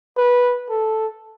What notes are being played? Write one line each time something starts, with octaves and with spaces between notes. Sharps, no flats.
B4
A4